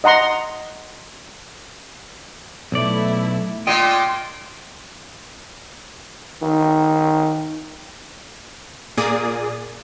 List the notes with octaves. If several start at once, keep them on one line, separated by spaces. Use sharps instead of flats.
D#5 F#5 A#5 C6
B1 A3 E4 D5
A#2 D#5 G5 C6
D#3
A#2 A#3 G#4 D5 D#6